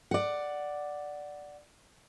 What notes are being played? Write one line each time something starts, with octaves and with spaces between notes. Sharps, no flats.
D5 F#5